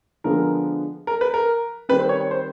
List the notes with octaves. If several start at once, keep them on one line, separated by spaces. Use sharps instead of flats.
D3 F3 G#3 B3 A#4
A#4
B4
A#4
D#3 G3 C4 B4
C5
C#5
C#5
C5